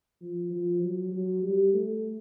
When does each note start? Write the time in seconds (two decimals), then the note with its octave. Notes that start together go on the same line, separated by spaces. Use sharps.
0.21 F3
0.52 F3
0.83 F#3
1.12 F#3
1.43 G3
1.74 A3